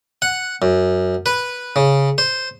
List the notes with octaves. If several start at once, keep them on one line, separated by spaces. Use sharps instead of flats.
F#5
F#2
B4
C#3
C5